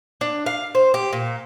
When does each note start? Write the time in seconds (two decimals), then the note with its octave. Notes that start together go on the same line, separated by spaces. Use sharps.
0.21 D4
0.46 F5
0.75 C5
0.94 G4
1.13 A#2